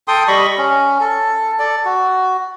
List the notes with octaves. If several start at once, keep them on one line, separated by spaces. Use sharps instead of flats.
A4 G5 C6 D#6
G3 D#5 B5 C#6
C#4
A4
A4 D5
F#4